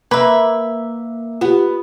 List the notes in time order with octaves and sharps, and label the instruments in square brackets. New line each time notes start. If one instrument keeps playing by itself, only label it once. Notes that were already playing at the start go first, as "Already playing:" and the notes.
[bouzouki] A#3 E5 [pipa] B4
[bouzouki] B3 [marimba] F4 G4